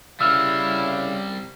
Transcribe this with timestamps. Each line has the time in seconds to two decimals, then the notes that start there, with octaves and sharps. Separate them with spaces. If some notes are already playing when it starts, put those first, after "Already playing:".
0.21 C#3 G3 C4 E4 F5 E6 F6